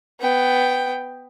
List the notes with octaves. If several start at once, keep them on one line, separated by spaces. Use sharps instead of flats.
B3 G5